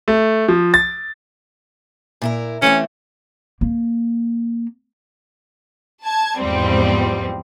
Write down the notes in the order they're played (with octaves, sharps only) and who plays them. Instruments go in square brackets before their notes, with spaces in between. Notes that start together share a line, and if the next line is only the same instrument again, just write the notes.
[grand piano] A3
F3
A6
[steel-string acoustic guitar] A#2 E4 A#4
[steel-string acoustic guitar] E3 A3 C4 [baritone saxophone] C#4
[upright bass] A#3
[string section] A5 G#6
E2 G#2 F3 G3 C4